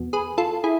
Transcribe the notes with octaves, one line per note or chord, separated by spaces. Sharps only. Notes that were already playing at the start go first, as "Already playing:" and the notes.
Already playing: E2 B2
G#4 B4
F4 A4
E4 G#4